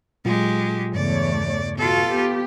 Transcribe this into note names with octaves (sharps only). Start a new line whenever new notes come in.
A#2 F#3 G#3 F4 G4
E2 G2 C#3 A3 C#5 D5
B2 F4 F#4 A4
B3 G4